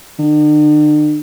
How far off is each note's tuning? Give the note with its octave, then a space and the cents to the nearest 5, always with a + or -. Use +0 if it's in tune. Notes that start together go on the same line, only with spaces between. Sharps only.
D3 +45